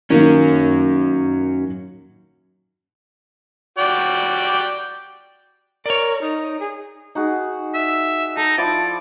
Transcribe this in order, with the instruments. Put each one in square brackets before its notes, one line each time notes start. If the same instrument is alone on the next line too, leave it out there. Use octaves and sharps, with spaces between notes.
[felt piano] D#3 A#3 [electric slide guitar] F#3 C#4
[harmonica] F#4 D5 G5
[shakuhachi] A#4 [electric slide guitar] C#5 D5
[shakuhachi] D#4
G#4
[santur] D#4 F#4 G#4
[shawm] E5
[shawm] D#4 [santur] A4
[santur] F3 E4 [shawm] D5